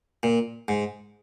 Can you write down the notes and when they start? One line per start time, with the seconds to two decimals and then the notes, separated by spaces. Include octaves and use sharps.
0.23 A#2
0.68 G#2